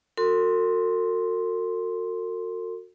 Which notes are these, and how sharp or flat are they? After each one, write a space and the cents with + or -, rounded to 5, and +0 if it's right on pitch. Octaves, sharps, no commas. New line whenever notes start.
F#4 -25 A4 +45 C6 +0